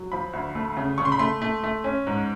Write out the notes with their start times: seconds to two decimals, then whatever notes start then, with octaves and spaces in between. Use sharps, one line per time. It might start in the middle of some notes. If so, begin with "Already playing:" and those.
Already playing: F#3
0.12 F3 B5
0.33 D2
0.55 A3
0.77 C#3
0.98 C#3 C#6
1.05 C6
1.12 B5
1.19 A3 C6
1.42 A3
1.64 A3
1.84 C#4
2.07 G#2